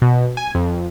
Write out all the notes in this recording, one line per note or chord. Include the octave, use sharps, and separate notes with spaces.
B2
G#5
F2